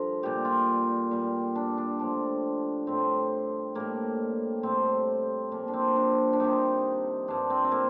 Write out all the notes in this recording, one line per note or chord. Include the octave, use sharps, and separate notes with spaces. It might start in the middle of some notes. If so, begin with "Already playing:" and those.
Already playing: G2 D3 F3 A#4
A#2 G3 G4
F4
A#2 G3
D4
D4
A2 F3 D4
A2 G3 C4
A2 G3 A#3
A2 G3 C4
A#2 F3 A#3
D4
C4
D4
D4
C3 D#3 G3 D#4
G2 F3 D4
C4
C4
A#3